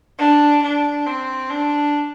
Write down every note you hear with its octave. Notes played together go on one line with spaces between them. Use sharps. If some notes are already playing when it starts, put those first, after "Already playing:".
D4
D4
C4
D4